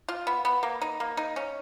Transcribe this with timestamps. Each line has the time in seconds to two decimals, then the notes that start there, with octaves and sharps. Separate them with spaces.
0.09 F4
0.27 B3
0.45 B3
0.63 A#3
0.81 D#4
1.00 A#3
1.17 D#4
1.36 C#4